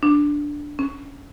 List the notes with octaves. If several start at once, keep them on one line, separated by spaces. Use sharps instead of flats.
D4
C#4